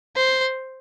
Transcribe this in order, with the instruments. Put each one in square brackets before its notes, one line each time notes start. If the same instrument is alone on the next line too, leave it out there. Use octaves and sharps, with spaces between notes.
[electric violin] C5